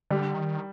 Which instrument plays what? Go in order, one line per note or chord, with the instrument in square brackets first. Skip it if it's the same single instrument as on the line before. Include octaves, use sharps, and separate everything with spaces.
[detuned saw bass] D3 [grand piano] G3
[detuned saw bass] D#3